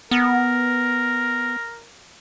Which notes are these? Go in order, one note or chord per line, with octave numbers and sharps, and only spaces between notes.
B3 A#4